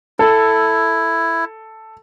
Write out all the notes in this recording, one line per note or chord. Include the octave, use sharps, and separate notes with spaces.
E4 A4